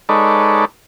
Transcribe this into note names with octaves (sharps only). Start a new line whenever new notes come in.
G#3 D#4 A4 B4 C#5 D5